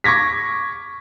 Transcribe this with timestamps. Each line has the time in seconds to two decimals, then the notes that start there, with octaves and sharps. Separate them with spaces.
0.04 C#6 D6 G#6 A#6 B6